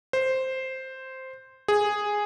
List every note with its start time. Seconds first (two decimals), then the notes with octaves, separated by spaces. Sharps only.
0.13 C5
1.68 G#4